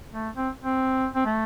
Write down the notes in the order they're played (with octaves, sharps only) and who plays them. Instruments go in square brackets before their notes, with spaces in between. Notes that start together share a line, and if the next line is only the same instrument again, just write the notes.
[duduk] A3
C4
C4
C4
A3